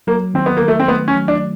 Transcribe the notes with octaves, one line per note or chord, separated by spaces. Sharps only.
F#3 A#3
D#3 C4
B3
D#3 A#3
A3
C4
A3 B3
C#4
F#3
D4